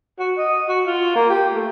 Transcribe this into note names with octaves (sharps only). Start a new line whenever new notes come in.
F#4
D#5
F#4
F4
A#3
G4
A3